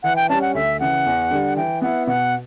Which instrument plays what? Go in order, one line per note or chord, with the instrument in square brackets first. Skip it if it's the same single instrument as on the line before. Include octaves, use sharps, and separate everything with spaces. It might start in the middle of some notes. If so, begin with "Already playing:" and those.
[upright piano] E3 [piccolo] F#5
[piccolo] G5
[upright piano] G3 C#4 [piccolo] A5
[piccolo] F#5
[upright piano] D2 [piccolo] E5
[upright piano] C#3 E3 [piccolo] F#5
[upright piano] E2
D3 G3 D4
[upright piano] E3 [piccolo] G5
[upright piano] B3 E4 [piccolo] F#5
[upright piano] B2 [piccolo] F#5